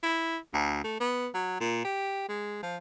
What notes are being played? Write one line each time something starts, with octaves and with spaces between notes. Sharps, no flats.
E4
D2
A3
B3
F#3
A#2
G4
G#3
F3